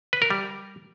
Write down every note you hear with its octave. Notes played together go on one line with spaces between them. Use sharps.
B4
A#4
G3